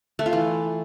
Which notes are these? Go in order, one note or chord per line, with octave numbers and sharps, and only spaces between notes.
A3
F4
E3